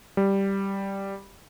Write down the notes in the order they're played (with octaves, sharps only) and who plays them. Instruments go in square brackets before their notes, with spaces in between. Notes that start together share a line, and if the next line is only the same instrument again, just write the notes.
[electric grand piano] G3